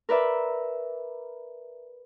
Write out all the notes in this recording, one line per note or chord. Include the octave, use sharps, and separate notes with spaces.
A#4 B4 D5 E5